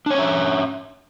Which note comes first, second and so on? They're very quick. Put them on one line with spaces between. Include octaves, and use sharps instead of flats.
D4 C#5 C#4 E5